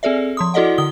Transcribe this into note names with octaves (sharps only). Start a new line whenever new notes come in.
C4 G#4 A4 D5 E5
F3 C6 D#6
E4 F#4 A4 D5 D#5 F#5
D3 D#6 G7